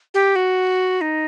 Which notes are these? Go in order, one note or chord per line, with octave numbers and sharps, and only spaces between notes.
G4
F#4
D#4